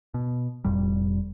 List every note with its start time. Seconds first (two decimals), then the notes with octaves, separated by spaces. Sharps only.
0.14 B2
0.64 F1 F2 A#2 G3